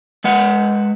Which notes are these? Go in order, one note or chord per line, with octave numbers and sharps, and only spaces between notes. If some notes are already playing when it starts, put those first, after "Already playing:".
G#3 B4 F#5